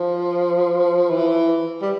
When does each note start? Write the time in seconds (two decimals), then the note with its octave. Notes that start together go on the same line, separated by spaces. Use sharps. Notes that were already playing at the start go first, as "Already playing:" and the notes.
Already playing: F3
1.10 E3
1.82 G3